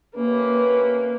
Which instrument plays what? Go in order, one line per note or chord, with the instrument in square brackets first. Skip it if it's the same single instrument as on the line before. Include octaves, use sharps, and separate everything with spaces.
[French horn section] C3 C#4 B4 [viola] A#3